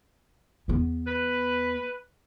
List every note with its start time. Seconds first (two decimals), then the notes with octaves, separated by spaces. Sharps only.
0.68 E2 B3
1.07 B4